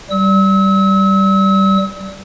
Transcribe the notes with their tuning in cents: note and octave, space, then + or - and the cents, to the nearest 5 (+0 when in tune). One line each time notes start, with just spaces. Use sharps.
G3 -15 E6 -40